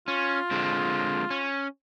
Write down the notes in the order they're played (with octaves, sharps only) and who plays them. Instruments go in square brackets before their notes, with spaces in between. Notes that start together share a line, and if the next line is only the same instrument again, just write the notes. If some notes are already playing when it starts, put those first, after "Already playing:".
[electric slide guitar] C#4 [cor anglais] F4
[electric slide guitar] D3 G#3 C4
C#4